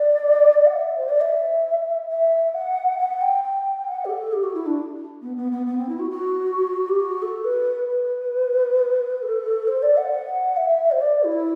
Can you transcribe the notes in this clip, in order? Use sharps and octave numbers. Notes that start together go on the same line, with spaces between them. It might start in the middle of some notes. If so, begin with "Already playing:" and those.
Already playing: D5
F#5
E5
C5
D5
E5
E5
F#5
F#5
G5
G5
F#5
G4
A4
G4
F#4
E4
D4
B3
B3
B3
B3
C4
E4
F#4
F#4
G4
F#4
A4
B4
B4
A4
C5
D5
F#5
F#5
E5
C5
D5
E4